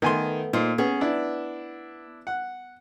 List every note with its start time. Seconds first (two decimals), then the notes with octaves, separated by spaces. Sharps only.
0.02 D#3 A3 B3 G#5 C6
0.53 A#2 D#4 C5
0.78 B3 C#4 G#4
1.01 D4 E4
2.27 F#5